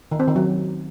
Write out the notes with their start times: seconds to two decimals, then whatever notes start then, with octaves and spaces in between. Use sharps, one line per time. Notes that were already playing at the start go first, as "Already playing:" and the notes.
0.11 D#3
0.20 C4
0.28 D#3
0.36 F#3